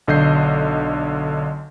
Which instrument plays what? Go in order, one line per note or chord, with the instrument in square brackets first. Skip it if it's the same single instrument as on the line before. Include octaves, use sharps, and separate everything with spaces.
[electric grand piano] B1 D3 D#5 G6 C7